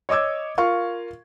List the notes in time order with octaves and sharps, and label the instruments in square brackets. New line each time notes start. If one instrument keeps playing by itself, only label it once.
[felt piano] C#5 D#5 D6 E6 G#6
F4 A#4 F5 C#6